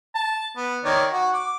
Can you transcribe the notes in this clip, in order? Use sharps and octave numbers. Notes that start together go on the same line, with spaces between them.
A5
B3
D#3 C#5 D5
F#4
D6